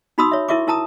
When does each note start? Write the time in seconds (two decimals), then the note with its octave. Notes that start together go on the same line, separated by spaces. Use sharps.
0.18 D#4 F#4 B5 C6 D#6 E6
0.31 C#5 E5
0.49 E4 A#4 E5 C#6 D6
0.67 E4 A#4 A5 A#5 D#6